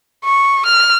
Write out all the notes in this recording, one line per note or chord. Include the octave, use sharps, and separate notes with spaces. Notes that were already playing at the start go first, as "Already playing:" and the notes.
C#6
F6